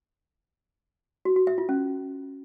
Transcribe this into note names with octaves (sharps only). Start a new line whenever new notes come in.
F#4
F#4
E5
F4
C#4